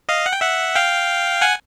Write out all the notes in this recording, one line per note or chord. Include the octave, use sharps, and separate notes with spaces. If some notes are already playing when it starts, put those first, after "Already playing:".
D#5 F5
F#5
G5
E5 F#5
F5 G5
F#5 G#5